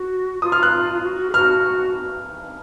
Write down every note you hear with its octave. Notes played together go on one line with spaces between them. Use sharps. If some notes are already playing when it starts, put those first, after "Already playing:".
Already playing: F#4
F4 D#6
F6
F#6
F4
F#4
F#4
G#4
F#4 F6